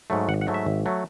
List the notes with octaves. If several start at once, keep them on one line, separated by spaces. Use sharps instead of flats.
G#2 F#3 A3
G#1 F#5
F#5
G#2 F#3 A3
E5
G#1
F#3 A3